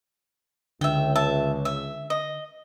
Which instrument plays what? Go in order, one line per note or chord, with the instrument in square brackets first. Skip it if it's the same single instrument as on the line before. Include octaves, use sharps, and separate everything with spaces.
[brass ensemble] C#2 [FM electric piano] D3 [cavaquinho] E5 G5
[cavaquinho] E5 A5
E5
D#5